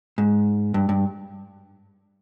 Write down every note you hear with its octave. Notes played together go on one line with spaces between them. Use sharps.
G#2
G2
G2